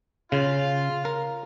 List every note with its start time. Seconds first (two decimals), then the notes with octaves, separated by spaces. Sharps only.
0.32 C#3 F4 F5
1.05 A#4